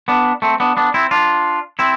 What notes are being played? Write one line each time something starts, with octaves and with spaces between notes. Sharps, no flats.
B3 D4
A3 C4
B3 D4
B3 D4
C4 E4
D4 F4
C4 E4